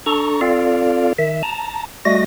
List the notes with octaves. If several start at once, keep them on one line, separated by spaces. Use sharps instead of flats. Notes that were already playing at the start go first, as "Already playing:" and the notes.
D4 A4 A#5 C#6
C4 F4 A4 D5 F5
D#3 E5
A5 A#5
G3 A3 F#4 D#5 A#6